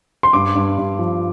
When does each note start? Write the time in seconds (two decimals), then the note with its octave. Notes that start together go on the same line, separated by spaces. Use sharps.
0.23 C6
0.33 G2 D6
0.55 G2
0.78 G2
0.99 F3